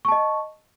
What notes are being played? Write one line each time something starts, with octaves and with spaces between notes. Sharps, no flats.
D#5 A5 C#6